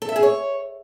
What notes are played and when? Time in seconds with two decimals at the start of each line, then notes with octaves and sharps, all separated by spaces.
0.02 A4
0.09 E5
0.16 G#4
0.23 C#5